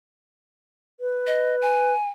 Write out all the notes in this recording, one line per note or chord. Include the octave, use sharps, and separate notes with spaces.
B4
D#5
G#5